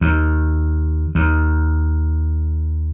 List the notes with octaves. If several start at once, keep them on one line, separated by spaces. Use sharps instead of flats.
D#2
D#2